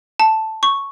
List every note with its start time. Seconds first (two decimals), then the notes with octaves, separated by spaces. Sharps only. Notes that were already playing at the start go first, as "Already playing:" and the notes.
0.20 A5
0.63 C#6